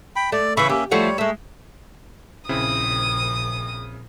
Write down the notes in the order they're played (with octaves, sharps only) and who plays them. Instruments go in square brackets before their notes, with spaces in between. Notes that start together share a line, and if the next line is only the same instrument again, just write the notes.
[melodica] G5 B5
[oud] A3 [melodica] D5
[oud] C#3 E3 [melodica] E5 B5 C#6
[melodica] A#3 C#4 E5 [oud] G4
[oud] F3 A3 F#4 [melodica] G3 C#5
[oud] G#3 E5 [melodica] A3
[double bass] A#1 [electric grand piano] C#3 C4 E4 [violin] D#6